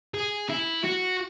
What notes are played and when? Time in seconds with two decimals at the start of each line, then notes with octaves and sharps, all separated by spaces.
0.14 G#4
0.49 E4
0.84 F#4